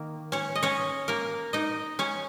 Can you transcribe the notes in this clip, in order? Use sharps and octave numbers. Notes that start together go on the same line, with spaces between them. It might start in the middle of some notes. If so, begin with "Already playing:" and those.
Already playing: D#3 A#3
C#4 C#5
D#5
C#4 C#5
A#3 A#4
D#4 D#5
C#4 C#5